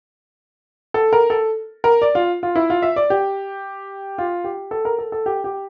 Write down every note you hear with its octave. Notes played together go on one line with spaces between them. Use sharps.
A4
A#4
A4
A#4
D5
F4
F4
E4
F4
E5
D5
G4
F4
G4
A4
A#4
A4
A4
G4
G4